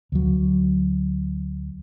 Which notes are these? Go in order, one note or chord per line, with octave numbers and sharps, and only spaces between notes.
D2 F#3